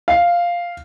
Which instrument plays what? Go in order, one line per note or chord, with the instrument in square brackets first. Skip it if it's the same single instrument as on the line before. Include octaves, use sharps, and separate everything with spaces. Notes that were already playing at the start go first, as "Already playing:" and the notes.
[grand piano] F5